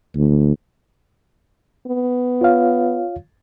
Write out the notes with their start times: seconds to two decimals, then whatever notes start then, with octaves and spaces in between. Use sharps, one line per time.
0.15 D2
1.87 B3
2.41 F4 C#5 F5